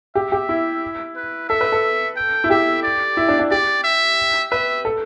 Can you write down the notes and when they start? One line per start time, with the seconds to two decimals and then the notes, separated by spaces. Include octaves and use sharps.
0.15 G4 E5
0.32 G4
0.49 E4
1.16 B4
1.49 A4 E5
1.61 B4
1.72 A4
2.17 G5
2.44 E4
2.50 G4 E5
2.83 D5
3.17 E4
3.29 D4
3.39 D4
3.51 G4 D5
3.84 E5
4.51 B4 E5
4.85 A4